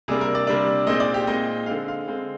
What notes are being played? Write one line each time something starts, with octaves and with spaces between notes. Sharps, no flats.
C3 G3 A#3 D4 G#4
A#4
D5
C3 G3 A#3 D4
A#2 G#3 C4 D#4 D#5
D5
G4
A#2 G#3 C4 D#4 D#5
D3 G#3 C4 F5
F5
D3 G#3 C4